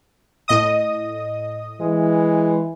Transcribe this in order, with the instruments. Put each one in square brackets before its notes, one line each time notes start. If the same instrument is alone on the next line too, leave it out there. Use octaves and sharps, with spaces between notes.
[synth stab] A2 D#5 D#6
[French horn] E3 [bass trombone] G#3